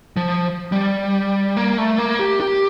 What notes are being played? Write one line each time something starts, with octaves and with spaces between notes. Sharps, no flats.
F3
G3
A#3
A3
A#3
G4
G4